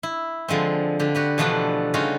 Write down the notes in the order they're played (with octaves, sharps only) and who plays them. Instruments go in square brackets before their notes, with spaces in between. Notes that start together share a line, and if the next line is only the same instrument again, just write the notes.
[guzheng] E4
D3 F3 G#3 C4
D3 G4
F#4 G4 B4
B2 E3 F3 A3 B3 D4
C#3 G3 C#4 D#4 F4 F#4